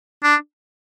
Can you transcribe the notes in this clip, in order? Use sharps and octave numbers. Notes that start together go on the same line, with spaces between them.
D4